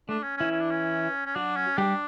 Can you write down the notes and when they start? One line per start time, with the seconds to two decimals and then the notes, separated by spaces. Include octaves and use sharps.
0.09 A3 D4
0.23 C#4
0.37 E3 C#4 E4
0.51 C#4
0.61 D4
0.71 C#4
1.26 C#4
1.35 F#3 D4 F#4
1.56 C#4
1.78 G3 D4 G4